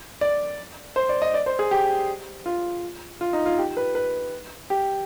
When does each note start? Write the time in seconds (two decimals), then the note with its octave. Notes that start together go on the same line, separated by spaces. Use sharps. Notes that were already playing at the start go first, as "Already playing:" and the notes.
0.21 D5
0.96 C5
1.09 D5
1.22 D#5
1.34 D5
1.46 C5
1.59 G#4
1.71 G4
2.46 F4
3.21 F4
3.33 D#4
3.46 F4
3.58 G4
3.77 B4
3.95 B4
4.70 G4